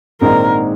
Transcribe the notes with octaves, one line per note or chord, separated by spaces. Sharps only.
A#1 G#2 D#3 G#3 C4 A#4